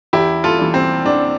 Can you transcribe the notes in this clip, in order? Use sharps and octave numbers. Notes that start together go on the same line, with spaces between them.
E2 E4 G4
F4 A4
E3 G3
C4
E2 D4